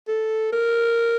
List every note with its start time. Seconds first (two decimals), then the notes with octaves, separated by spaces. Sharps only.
0.08 A4
0.53 A#4